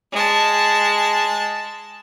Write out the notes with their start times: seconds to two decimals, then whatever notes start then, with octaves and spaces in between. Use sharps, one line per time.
0.12 G#3 A5